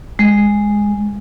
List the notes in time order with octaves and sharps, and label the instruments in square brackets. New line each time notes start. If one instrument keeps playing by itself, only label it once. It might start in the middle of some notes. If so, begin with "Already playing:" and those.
[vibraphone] G#3